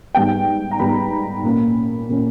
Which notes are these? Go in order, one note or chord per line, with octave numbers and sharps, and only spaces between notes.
G#2 G3 B3 G5
A#5
G#2 G3 B3 B5
A#2 A#3 C#4
A#2 A#3 C#4